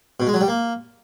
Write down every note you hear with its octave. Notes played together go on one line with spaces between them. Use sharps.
B2
G#3
F#3
G3
A#3